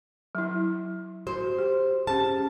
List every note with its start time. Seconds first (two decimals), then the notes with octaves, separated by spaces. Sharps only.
0.35 F#3 E4
1.27 F#4 C5 C6
1.59 G4
2.07 C#4 G4 G#4 A5